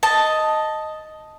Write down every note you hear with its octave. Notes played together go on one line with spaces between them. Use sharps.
D#5 A5